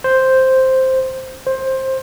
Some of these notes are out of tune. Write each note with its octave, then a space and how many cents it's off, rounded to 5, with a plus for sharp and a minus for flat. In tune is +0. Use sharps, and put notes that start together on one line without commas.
C5 +0
C5 +15